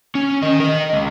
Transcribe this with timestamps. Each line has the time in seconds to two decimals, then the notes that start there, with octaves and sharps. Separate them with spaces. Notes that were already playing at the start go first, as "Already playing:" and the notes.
0.15 C#4
0.43 D#3 D#5
0.60 A#4 D#5
0.93 C#2